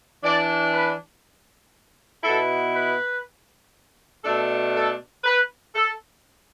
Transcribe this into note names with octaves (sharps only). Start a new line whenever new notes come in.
E3 D4 D5
B4
B2 B3 E4 A4
B4
B2 A3 D4 A4
A4
B4
A4